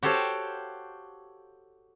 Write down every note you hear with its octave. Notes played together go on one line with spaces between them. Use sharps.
F#4 G4 A4 C5 C#5 F5